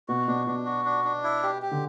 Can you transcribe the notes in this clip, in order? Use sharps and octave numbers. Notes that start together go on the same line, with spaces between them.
B2 F#4
B2 D4
B2 D4
F#4
D4
D4
E4
G4
G4
D3